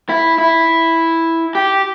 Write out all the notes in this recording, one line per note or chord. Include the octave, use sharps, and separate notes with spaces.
E4
E4
G4